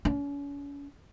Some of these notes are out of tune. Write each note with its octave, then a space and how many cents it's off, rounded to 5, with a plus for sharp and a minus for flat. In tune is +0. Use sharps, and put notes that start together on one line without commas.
C#4 +40